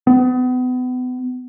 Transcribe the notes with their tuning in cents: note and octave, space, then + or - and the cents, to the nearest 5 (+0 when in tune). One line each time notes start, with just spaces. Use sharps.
B3 +35